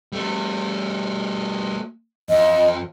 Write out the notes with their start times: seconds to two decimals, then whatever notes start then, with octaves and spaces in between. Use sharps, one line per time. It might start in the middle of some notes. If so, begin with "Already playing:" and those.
0.12 G3 A3
2.29 F2 D#5